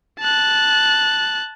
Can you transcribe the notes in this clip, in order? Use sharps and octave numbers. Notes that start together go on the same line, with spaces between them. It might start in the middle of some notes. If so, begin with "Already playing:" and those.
A5 F#6